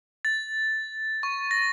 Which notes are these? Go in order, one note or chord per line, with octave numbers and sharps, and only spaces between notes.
A6
C#6
A#6